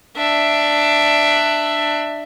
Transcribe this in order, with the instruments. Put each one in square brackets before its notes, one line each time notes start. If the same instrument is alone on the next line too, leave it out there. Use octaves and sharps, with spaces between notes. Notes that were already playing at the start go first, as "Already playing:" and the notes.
[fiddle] D4 E5